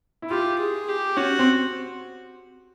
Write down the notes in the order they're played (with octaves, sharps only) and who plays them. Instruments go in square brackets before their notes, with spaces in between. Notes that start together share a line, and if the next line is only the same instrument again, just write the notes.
[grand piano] E4
[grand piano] F4 [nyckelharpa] G4
[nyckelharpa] G#4
G4
[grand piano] C#4 [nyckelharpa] F#4
[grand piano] C4